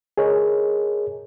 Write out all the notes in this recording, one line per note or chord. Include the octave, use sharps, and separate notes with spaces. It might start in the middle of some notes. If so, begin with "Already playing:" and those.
G#4 A#4 C#5 D#5